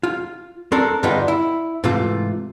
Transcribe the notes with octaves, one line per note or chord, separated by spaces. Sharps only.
F4
C4 D4 A4 A#4
G2 D3 B3 D4 D#4 F4
E4
G#2 C3 E3 A3 F4